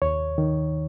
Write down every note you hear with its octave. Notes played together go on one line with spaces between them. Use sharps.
D#2 C#5
D#3